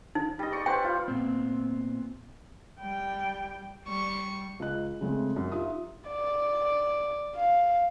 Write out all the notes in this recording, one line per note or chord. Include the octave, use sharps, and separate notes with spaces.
D#4
G3 D#5
D5 C#6
B4 C5 G5
F4
A#2 B3 C4
G3 G5
G3 C#6
C#2 D#5 F#6
C#3 G#3 A3 C4
F#2
D#4 F4 G4 E5 D#6
D5
F5